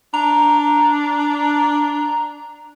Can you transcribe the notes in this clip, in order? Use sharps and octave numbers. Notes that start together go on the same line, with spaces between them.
D4 A#5